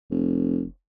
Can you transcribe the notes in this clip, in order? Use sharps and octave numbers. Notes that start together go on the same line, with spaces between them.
F1